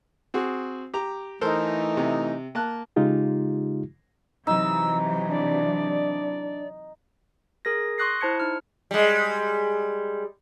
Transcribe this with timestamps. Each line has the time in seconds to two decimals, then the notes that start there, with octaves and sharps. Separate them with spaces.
0.34 C4 F#4 G#4
0.94 G4 A#5
1.41 E3 A3 D#4 A4 A#4 C5
1.97 C3
2.55 A#3 A5 F#6
2.96 C#3 G#3 D#4 F4 G4
4.47 C3 E3 F#3 D#4 E6
5.30 D4 D5
7.65 G#4 A#4 G#6 A#6
7.98 C6 C#6 D#6 F#6 A#6 C7
8.21 E4 C5 A5 G#6 C#7
8.40 D#4 F6
8.91 G3 G#3